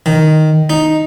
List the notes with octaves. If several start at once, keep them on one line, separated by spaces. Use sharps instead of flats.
D#3
D#4